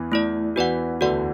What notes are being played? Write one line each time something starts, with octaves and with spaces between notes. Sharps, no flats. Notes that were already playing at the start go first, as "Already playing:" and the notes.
Already playing: E2 E3
A3 E4 D5
E2 E3 F#4 B4 D5 F#5
D2 D3 F#4 B4 D5 F#5